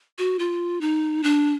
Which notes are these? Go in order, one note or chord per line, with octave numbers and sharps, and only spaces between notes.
F#4
F4
D#4
D4